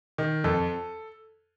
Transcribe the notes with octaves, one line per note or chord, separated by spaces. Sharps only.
D#3
F2 A4